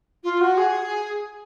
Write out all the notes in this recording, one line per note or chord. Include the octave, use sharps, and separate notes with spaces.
F4
F#4
G#4